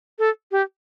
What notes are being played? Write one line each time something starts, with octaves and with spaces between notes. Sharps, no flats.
A4
G4